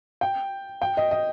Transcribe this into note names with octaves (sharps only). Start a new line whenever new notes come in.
G5
G5
D#5
D#5